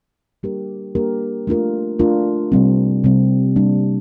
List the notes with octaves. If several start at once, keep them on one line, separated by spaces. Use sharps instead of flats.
G3 A#3 D4 G4 A#4
G3 A#3 D4 G4 A#4
A3 D4 F4 A#4
A3 D4 F4 A#4
C3 G3 C4
C3 G3 C4
G3 A#3 D4